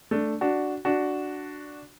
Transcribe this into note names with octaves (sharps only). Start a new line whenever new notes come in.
A3 D4
D4 F#4
D4 F#4